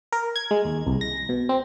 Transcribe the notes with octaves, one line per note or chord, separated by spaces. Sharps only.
A#4
G#6
G#3
D#2
C2
A#6
B2
C4